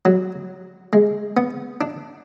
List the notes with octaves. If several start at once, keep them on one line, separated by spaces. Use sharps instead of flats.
F#3
G#3
B3
D4